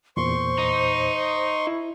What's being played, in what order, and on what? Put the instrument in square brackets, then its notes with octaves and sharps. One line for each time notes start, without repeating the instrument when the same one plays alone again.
[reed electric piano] E2 A#2 [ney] C5 [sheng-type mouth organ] C6 C#6
[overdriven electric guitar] D#4
[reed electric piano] E4